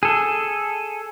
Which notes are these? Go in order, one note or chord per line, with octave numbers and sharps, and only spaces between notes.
G#4 A4